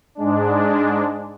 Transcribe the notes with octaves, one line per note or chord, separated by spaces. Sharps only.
G#2 G#3 D4